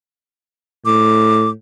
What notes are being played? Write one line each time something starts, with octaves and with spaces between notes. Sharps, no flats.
A2 D6